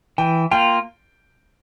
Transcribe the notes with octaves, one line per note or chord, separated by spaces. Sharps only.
E3 G5
A#3 F4 G5